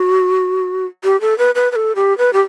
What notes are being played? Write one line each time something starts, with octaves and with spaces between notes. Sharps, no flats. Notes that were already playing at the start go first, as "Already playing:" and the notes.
Already playing: F#4
G4
A4
B4
B4
B4
A4
G4
B4
G4